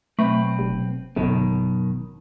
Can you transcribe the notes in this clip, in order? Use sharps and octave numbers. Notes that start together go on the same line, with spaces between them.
B1 A3 C4 B4
F1
G1 F#2 B2 D#3